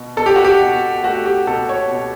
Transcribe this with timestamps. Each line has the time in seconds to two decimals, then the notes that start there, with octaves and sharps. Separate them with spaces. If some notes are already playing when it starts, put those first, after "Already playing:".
Already playing: B2
0.17 B2 A4
0.26 G4
0.35 F#4
0.45 G4
0.60 B2
1.04 A3 F#4
1.26 G4
1.47 B2 A4
1.69 C#5
1.91 B2